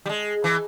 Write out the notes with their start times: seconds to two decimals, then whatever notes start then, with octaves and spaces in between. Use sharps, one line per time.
0.06 G3
0.09 G#3
0.44 E3